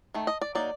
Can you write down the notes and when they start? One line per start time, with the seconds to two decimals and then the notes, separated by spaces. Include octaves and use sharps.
0.14 D#3 A3
0.27 D#5
0.41 D5
0.55 F#3 A#3 D#4 D5